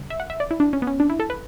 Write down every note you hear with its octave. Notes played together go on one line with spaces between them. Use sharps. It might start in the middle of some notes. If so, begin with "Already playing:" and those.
Already playing: C#3 G3
E5
F#5
E5
D5
E4
D4
C#4
B3
C#4
D4
E4
A4
B4